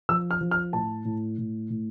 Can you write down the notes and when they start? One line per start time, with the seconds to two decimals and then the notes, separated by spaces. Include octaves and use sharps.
0.09 F3 E6
0.31 F6
0.41 F3
0.51 F6
0.73 A2 A5
1.05 A2
1.38 A2
1.70 A2